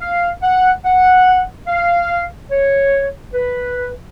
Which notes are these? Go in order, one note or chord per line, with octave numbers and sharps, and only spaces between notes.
F5
F#5
F#5
F5
C#5
B4